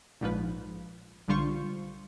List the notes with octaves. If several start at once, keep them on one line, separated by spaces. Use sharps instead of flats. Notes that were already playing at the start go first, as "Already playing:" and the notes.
A#1 G#2 F3 B4
B1 D3 G3 F4 C5 C#6